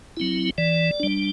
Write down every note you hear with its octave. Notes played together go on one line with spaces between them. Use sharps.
F#3 C4 E4
E3 D5
G3 D4